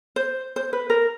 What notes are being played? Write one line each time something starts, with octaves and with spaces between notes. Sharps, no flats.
C5
C5
B4
A#4